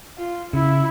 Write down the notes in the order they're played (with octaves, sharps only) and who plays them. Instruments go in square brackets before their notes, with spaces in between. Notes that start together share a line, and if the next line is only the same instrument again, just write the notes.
[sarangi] F4
[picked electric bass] C#3 [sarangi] E4